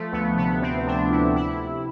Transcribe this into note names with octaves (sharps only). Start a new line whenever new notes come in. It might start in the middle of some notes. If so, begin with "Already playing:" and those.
Already playing: F3 A3
D2 B3
C3 B3
D2 C4
C3 D4
C3 E4
E4